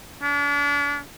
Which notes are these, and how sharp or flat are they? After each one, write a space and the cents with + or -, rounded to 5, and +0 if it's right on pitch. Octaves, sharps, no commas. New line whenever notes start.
D4 -40